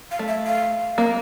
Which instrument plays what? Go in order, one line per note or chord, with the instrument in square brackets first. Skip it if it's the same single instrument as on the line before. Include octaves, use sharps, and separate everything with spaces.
[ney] F5
[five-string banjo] A3
[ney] E5
F5
[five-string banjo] A#3 [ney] F5